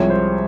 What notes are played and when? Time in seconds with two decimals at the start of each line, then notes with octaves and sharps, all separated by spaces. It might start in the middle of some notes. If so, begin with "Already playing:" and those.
Already playing: C2 C3 F3 G#3 C#5
0.10 C5